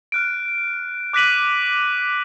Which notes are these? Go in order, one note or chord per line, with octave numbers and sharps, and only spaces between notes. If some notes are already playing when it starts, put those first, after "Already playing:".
F6 F#6 D7
D6 F#6 A#6 B6 D#7 F#7